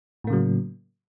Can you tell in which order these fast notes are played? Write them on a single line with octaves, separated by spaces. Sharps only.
A2 A#3 C#3 F#3